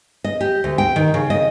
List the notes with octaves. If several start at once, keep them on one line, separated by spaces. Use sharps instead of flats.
D#5
G4
D2
G5
D#3
C#3
D#5